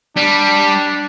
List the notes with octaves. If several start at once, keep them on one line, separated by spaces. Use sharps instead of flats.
G3 D4